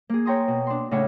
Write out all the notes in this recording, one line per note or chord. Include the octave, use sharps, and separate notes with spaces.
A#3 G#4
C#5 G5 A#5 C6 D#6
B2
D4 C6
A2 C#3 D4 C#5 F#5 G#5